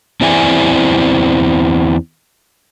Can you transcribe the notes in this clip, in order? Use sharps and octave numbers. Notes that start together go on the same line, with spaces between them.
E2 C4 E4 D5 E5 G#5